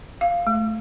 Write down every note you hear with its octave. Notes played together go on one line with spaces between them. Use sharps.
F5
A3